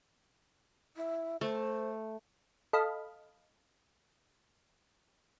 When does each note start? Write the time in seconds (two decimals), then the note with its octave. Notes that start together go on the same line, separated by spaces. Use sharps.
0.96 E4
1.41 A3 C5
2.73 A4 D#5 F5 B5